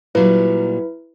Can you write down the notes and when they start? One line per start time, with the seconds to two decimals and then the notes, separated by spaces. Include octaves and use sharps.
0.15 A#2 F#3 G3 E4 B4